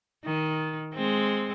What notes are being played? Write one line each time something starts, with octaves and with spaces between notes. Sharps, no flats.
D#3
G#3 C4